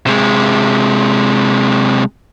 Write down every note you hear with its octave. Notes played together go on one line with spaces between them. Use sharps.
C3 G#3